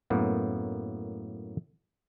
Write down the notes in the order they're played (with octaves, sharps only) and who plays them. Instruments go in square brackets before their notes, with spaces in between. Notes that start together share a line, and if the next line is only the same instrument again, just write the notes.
[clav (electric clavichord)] F#2 A2 A#3 B3